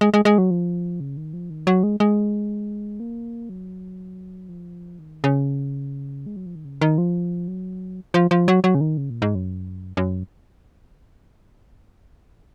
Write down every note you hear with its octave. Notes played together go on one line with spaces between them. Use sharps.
G#3
G#3
G#3
F#3
F3
C#3
D#3
F3
D#3
F#3
G#3
G#3
A#3
F#3
F3
D#3
C#3
G#3
F#3
F3
D#3
C#3
D#3
F3
F#3
F3
F3
F#3
F#3
C#3
D#3
C#3
A#2
G#2
F#2
F#2